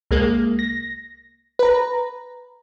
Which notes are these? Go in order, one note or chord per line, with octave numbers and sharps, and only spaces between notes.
C2 G#3 A#3
A#6
B4 A#5